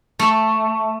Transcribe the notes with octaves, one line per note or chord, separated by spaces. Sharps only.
A3